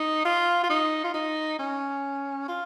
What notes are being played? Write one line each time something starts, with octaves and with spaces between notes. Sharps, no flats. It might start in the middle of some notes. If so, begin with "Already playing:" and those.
Already playing: D#4
F4
F4
D#4
F4
D#4
C#4
F4